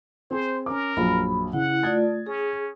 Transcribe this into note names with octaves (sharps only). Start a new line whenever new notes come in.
C4 G#4 C5
C#4 A#4 D6
A#1 F#2 B5
C#3 E4 F#5
A3 F4 D5 D#6 G#6 A6
C#4 G#4